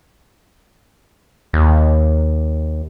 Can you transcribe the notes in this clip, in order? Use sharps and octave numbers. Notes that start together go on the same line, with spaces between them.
D#2